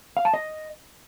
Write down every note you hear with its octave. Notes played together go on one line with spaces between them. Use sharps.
F5
A5
D#5